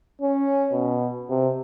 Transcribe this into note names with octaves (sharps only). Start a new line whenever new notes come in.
C#4
B2
C3